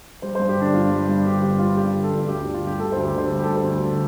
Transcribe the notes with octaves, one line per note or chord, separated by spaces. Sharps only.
G3 C5
G2 C5
G4
D3 D4
G1 F4
G3
G2
D3 G4
G1 G4
G3 F4
G2 G4
D3
A4
G1
D2 G4
D3 D4
F4
G3 G4
D2 A4
D2 C5
G4
D3 C5
G3
G4
D2 A4
C5
D2
D3